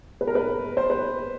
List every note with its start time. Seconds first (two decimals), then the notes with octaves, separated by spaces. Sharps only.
0.21 B4
0.27 A#4
0.35 B4
0.77 C5
0.90 B4